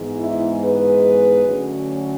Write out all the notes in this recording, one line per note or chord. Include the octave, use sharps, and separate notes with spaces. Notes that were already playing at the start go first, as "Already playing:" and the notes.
Already playing: G#2 E3 G#3 B3
E4
G#4 B4
D2 D3 F#3 C#4